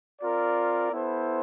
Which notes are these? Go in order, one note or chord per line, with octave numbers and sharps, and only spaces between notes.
C4 F4 A#4 D5
B3 E4 A4 C5